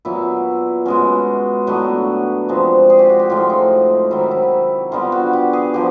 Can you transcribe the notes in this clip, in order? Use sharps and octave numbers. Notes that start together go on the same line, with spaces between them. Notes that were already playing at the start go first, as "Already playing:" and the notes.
A#2 F#3 B3 E4
B2 G#3 C#4 F#4
A2 F#3 B3 D4 F#4
C3 F3 G#3 C4
G#4
G4
F#4
G4
A2 F3 G#3 F4
D#4
C3 D#3 F#3 E4
E4
D3 G3 B3 F4
F#4
G4
G#4
D3 F3 G4